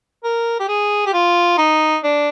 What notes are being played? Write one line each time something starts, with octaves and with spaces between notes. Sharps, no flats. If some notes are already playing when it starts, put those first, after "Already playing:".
A#4
G4
G#4
G4
F4
D#4
D4